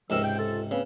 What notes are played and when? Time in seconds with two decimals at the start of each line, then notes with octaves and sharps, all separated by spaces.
0.10 C#2 G#2 C3 F3 A#4 E6
0.23 G5
0.37 F4 A4
0.71 C#3 A#3 C4 B4